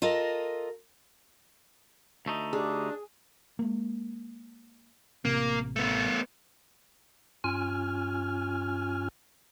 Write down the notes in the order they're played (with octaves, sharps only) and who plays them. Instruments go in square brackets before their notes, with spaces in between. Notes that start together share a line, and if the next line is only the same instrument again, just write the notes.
[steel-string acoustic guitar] F4 A4 A#4 D#5
[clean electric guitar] D2 A3 D#4
[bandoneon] D4 [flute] G4 [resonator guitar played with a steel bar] G#4
[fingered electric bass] G#3 A#3
[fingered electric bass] A1 C3 C4 [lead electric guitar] A#3
[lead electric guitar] A3 B3
[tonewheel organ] G2 C#4 F4 G#5 F6